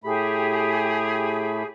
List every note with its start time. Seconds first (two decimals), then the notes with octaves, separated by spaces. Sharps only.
0.04 A2 A3 G4 G#4 B5